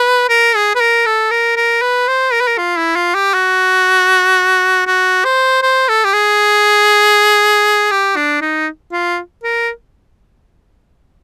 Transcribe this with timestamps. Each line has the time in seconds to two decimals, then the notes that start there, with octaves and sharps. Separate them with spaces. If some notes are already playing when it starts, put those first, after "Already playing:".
Already playing: B4
0.29 A#4
0.56 G#4
0.75 B4
0.80 A#4
1.06 A4
1.31 A#4
1.56 A#4
1.82 B4
2.08 C5
2.32 A#4
2.41 B4
2.48 A#4
2.58 F4
2.77 E4
2.96 F4
3.15 G4
3.34 F#4
4.87 F#4
5.24 C5
5.62 C5
5.88 A4
6.05 G4
6.13 G#4
7.91 G4
8.16 D4
8.41 D#4
8.92 F4
9.43 A#4